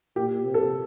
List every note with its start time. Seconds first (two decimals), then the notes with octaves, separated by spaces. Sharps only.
0.16 A#2 G4
0.45 C3
0.54 A4